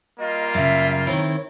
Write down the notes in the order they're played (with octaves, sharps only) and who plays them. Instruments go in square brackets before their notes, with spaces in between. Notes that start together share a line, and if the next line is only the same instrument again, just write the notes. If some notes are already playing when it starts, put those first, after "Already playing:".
[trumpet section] G3 A#3 F4 [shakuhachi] D#5
[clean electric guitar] F#2 C#3 [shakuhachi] E5
[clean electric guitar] D#3 C4 E4 [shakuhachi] C#5